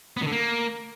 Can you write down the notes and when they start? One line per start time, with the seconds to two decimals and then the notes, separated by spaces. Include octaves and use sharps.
0.17 B3
0.22 D#3
0.27 D3
0.32 A#3